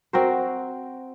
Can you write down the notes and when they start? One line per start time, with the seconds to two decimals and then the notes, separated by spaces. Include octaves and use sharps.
0.13 C4 F#4 A#4 C5